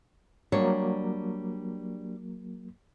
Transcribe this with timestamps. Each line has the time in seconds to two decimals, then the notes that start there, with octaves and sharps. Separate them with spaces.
0.52 F#3 G3 A#3 D4 C#5